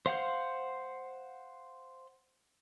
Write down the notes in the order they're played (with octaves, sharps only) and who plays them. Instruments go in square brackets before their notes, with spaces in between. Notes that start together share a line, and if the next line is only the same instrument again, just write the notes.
[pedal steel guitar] C5 F5 F#5 G6